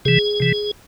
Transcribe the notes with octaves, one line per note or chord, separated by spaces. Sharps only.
C3 E3 G#4
C3 E3